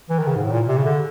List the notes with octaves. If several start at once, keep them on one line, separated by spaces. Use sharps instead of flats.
E3
D#3
C#3
G#2
A2
A#2
C3
C#3
D3